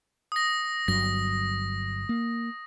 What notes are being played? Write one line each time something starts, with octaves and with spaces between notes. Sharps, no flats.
D#6 A#6
G1 G2 F#3 A#6
A#3